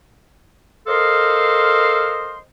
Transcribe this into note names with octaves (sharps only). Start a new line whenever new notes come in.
A4 A#4 C5 D#5 F5 C6